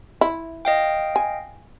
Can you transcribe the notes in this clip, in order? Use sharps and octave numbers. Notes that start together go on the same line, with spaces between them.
E4
D#5 F5 G5
G#5